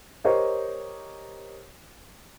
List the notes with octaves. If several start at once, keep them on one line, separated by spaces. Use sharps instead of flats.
G4 A#4 C5 C#5 D#5 C#6